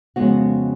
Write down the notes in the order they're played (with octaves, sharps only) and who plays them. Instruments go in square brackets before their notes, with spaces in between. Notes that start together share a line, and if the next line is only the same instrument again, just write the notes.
[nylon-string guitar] F2 C#3 G#3 B3 F#4